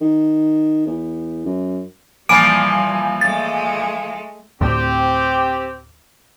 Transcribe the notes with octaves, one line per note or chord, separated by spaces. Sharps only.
D#3
E2
F#2
A#2 E3 F3 G3 G#5 B5 D6 D7
G#3 A3 A6
D2 A2 C4 G4